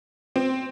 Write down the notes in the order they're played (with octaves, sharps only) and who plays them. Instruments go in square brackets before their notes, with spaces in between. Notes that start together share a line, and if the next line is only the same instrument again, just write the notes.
[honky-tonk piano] C4